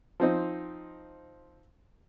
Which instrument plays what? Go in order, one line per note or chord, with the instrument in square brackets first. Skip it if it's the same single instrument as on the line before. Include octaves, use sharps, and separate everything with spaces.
[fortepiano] F3 C4 D#4